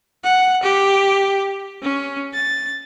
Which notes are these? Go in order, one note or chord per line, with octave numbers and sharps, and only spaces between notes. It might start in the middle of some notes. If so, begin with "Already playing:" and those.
F#5
G4
C#4
A6